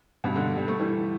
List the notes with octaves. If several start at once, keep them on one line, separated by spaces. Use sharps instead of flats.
G2 B2
B2 D3
G3
A3
E3 G3